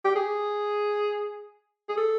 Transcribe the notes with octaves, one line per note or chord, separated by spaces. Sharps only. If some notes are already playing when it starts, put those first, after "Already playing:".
G4
G#4
G#4
A4